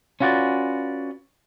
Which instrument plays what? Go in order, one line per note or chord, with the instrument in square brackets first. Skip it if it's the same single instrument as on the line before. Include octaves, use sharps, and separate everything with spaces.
[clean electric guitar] C#4 F4 F#4 B4 D5